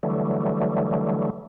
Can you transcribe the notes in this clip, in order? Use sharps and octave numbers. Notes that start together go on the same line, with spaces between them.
D3 E3 F#3 G3 A3